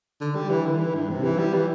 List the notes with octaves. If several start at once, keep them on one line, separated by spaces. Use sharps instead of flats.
D3
G3
E3
D3
E3
G2
C3
E3
G3
E3